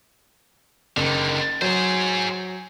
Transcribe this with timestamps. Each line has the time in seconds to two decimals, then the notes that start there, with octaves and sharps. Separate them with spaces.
0.97 F#1 D3 D#3
1.62 F#3 G#4 C5